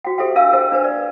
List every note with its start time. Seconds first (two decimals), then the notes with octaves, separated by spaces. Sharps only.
0.05 F#4 G5
0.18 G4 A4 C5 E5 G5
0.35 D4 A#4 F5 E6
0.53 A4 A#4 C5 D#5 G5
0.72 D4 B4 C5
0.84 D5